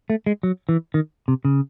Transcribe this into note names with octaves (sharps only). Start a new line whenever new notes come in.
A3
G#3
F#3
E3
D#3
C3
C#3